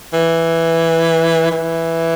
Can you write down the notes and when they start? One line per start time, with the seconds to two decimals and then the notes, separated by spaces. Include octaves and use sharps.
0.13 E3
1.51 E3